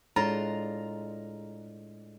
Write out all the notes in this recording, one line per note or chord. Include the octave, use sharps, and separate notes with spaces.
A2 G#3 D4 F4 A#5